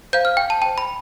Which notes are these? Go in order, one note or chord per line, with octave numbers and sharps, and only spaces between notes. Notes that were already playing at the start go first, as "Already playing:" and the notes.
C5 F5 G6
F6
G5
A5
C5 G5 A5
B5